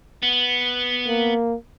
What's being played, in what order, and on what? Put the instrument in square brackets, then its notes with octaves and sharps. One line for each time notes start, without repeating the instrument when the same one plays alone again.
[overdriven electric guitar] B3
[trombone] A#3